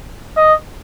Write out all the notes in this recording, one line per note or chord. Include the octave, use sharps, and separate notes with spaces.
D#5